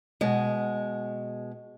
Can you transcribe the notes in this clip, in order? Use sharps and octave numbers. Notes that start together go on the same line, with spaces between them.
B2 G#3